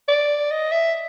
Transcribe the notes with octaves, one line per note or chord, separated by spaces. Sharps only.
D5
D#5
E5